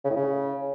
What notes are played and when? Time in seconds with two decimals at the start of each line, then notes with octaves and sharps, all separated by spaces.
0.05 C#3
0.10 A2
0.16 C#3